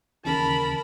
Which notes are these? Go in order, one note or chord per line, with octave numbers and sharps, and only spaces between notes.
D#2 C#3 E3 A#4 A5 B5